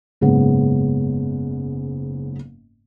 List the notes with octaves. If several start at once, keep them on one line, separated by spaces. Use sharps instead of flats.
F#1 G#2 C#3 B3